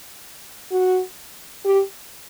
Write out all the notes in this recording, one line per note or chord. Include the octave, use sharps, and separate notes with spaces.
F#4
G4